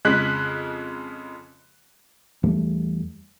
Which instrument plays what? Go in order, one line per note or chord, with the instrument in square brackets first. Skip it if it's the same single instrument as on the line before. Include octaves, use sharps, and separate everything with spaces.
[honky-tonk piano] F2 C#3 G#3 F#6 B6
[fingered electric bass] E2 G3 A3